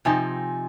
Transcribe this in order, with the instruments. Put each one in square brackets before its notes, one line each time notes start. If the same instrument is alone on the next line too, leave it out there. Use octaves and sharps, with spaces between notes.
[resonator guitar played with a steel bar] C3 F3 C4 D#4 [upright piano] G#5